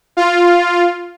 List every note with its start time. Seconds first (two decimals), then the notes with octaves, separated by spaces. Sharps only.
0.17 F4